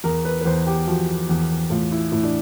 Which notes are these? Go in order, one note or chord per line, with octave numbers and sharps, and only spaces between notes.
E2 A#4
B4
B4
E2 C5
G4
F3 F#4
E2
A2 F4
E4
A2 E4
D4